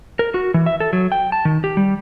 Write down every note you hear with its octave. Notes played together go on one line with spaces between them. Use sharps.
A#4
F#4
E3
E5
A4
F#3
G5
A5
D#3
G4
G3